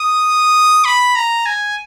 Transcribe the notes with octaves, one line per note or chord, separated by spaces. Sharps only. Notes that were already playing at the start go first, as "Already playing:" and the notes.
Already playing: D#6
B5
A#5
G#5